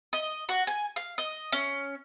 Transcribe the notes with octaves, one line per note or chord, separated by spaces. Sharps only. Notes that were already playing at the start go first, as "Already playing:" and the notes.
D#5
F#4
G#5
F5
D#5
C#4